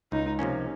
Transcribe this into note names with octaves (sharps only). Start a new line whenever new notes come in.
C#2 D#4
C3 F3 A#3 C#4